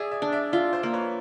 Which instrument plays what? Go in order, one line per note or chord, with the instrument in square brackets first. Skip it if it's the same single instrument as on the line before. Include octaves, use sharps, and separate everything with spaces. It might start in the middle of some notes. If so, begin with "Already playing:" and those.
Already playing: [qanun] G#4 [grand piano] D5 E5
[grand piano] D5 E5
[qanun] D4
[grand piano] D5 E5
[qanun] F4 [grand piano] D5 E5
[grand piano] C5 D5
[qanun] A#3
[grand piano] B4 C#5